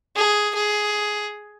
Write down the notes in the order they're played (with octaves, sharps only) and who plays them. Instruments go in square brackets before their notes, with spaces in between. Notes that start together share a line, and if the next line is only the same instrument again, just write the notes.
[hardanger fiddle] G#4
G#4